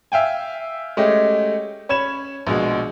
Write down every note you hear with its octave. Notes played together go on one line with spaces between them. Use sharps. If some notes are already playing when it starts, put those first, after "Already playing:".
E5 F5 G5 G#5
G#3 A3 C#4 G4 D#5
C#4 C#5 B5 G#6 E7
A#1 B2 G#3